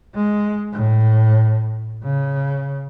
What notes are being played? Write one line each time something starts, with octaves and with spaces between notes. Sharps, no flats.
G#3
A2
C#3